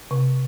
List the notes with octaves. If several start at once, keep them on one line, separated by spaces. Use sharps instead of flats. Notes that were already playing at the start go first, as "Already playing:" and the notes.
C3